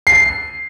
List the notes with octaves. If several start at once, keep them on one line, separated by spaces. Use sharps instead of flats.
C7